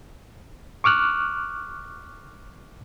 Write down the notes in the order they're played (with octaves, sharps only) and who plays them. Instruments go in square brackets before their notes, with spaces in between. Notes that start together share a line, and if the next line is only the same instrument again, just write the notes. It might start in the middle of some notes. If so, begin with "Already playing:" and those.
[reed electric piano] C#6 D6 F6 F#6